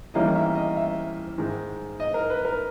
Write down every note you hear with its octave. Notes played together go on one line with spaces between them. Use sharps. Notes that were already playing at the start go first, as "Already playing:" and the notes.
E2 D#3 G3 A#3 C#4 D#5
E5
D#5
E5
G#2 D#3 G#3
D#5
A#4
B4
A#4